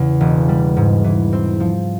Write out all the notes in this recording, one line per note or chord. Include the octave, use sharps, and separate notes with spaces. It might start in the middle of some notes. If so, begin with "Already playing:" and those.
Already playing: E2 C#3
E1
G3
G#2
E3
C4
F3